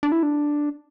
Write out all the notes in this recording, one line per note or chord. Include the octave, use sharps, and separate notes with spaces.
D4
E4
D4